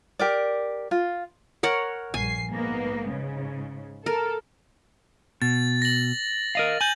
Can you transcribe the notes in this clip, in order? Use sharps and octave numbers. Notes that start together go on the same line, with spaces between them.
G4 A#4 D5
F4
A#4 C#5 F#5
A#1 G2 G#5 C7
G#2 A#3 B3
G#2 C#3
A4 A#4
B2 A6
A#6 F#7
A#4 D#5 F5
G#5 G6 F#7